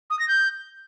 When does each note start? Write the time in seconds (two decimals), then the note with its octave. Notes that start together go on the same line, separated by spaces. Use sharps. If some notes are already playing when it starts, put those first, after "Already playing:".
0.10 D#6
0.19 A#6
0.28 G6